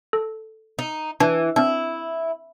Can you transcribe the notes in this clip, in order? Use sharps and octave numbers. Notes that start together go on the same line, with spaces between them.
A4
D#4
E3 D4
C4 D4 E4